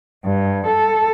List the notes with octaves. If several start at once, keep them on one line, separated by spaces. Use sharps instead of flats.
G2
A4